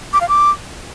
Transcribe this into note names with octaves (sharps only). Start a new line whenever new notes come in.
D6
F5
D6